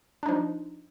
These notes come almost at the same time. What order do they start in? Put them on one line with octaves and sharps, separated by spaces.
D4 D#4 F3